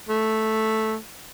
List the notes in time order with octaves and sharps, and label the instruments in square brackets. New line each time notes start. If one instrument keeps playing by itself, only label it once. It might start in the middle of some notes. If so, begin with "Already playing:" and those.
[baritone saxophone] A3